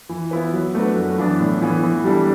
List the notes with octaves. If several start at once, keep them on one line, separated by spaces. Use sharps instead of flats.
E3
B3 E4 B4
F#3
A3 D4 F#4 B4
F#2
E3 B3 D4
A2
E3 B3
E3
G3 D4 A4